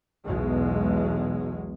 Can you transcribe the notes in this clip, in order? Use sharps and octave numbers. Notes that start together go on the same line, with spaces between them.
B1 E2 B2 G#3